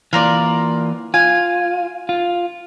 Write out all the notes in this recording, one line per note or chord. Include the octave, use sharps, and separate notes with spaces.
E3 A#3 F4 A#4 D5
F4 G#5
F4